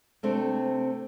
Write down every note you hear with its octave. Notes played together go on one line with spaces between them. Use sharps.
C3 A3 C4 D4